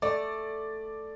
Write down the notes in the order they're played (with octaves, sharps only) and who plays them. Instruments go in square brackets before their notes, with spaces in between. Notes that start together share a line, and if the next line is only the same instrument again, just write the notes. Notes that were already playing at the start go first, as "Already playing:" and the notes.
[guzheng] A3 [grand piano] D5